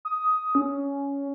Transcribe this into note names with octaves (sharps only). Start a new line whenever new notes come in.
D#6
C#4